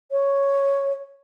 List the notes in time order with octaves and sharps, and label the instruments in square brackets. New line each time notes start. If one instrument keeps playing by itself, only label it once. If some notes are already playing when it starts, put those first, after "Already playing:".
[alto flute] C#5